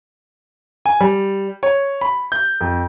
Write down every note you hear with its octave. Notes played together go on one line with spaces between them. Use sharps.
G#5
G3
C#5
B5
G6
F2